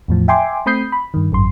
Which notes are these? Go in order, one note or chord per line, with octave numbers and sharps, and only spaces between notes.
E2 A2 F3
E5 G5 G#5 C6 D6
A3 C4 B5 D#6 G6 C7
B5
G2 D#3
G#1 F#2 C6